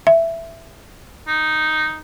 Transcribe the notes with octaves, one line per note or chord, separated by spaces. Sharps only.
E5
D#4